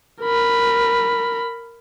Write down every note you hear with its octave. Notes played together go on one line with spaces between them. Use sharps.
A#4 B5